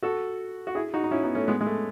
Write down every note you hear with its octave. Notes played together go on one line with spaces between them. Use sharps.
F#4 A4
F#4
E4 G#4
D#4 F#4
D#4
C#4 E4
B3 D#4
A3 C#4
G#3 B3
G#3
A3